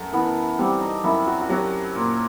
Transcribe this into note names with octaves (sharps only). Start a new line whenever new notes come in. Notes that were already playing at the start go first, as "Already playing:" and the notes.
Already playing: F#2 A3
E3 B3
G3 C4
D#4
F#2 E4
F#4
F#4
F#3 G4
A#2